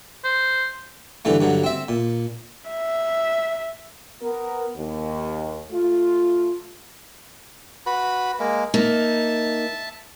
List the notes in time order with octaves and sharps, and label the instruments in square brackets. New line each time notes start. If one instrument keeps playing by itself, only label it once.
[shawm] C5
[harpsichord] G2 D3 E3 A3
G2 D3 F#3
C4 E5
A#2
[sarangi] E5
[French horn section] B3 A#4
D#2
A3 F4
[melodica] F#4 B4 B5
G#3 A#3
[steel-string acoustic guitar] A#3 D#4 [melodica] E5 A5